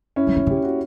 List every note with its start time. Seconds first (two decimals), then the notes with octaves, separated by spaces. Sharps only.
0.16 C#4 E4
0.27 G3
0.36 B3
0.46 C#3 G4
0.63 F#4